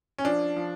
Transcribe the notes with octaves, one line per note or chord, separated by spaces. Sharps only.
C#4
F3 D4
F3